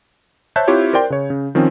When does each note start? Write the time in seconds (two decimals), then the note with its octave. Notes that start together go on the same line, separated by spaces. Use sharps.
0.56 C5 C#5 E5 A5 F#6 G6
0.68 C4 E4 F4 G4 C#5
0.93 A#4 C5 D5 G5 C6
1.10 C#3 C#5
1.30 C#3
1.55 D#3 F3 C4 C#4